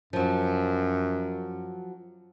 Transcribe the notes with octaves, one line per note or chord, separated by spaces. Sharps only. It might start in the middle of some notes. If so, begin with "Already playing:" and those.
F#2 F3 F#3